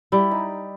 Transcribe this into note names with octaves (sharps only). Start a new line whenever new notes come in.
G3 E4
D#4